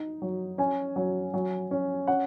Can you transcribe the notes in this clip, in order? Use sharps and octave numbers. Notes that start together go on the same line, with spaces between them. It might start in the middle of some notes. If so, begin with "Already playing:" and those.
Already playing: D#4
F#3
C#4 G#5
F#3
F#3
C#4
C#4 F#5